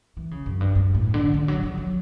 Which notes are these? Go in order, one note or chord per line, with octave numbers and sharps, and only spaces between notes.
E3
C#3
F#2
G2
G2
A2
D3
D3
F#3
F#3
F#3